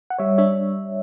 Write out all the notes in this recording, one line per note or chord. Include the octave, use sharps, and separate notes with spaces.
F#5
G3 C#5 E5
D4 C#5 E5